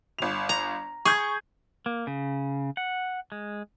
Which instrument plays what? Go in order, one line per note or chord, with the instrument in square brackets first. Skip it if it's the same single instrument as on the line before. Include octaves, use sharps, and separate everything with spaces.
[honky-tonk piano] G1 F7
[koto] A#5
[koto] G#4 [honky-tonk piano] C#6 G6 G#6
[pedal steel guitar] A#3
C#3
F#5
G#3